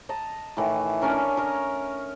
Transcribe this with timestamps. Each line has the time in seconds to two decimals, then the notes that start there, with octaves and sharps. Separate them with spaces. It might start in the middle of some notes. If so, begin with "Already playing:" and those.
0.09 D#5 A5 A#5
0.57 A2 D#3 E3
1.02 C#4 D4 A#4 C#5
1.37 A#4 C#5 D#5